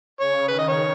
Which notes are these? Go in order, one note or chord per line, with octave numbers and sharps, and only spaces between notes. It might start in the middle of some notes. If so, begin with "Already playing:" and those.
C#3 C#5
D#3 B4
D#5
C#5